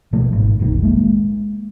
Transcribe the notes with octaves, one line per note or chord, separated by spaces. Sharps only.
B2 F3 A3
G#1
F1 A#1 D#3
G#3 A#3